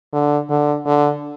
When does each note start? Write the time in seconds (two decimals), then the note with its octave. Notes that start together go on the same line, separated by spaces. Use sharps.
0.13 D3
0.50 D3
0.86 D3